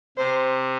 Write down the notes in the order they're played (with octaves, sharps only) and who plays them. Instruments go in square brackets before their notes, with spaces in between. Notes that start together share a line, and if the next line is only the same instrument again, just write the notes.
[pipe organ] C3 [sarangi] C5